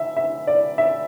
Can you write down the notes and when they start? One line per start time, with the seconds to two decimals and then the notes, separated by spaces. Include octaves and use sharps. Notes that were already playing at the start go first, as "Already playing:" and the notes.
Already playing: E5
0.17 E5
0.47 D5
0.78 E5